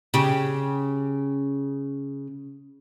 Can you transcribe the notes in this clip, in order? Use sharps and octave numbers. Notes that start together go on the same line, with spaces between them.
C#3 G4